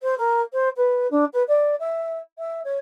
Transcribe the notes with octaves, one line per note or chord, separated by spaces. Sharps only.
C5
A#4
C5
B4
D4
B4
D5
E5
E5
C#5